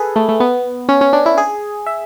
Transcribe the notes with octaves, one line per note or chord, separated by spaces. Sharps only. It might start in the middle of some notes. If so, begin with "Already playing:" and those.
Already playing: G#4 A4 B4
A3
A3
B3
C#4
C#4
D4
E4
G#4
E5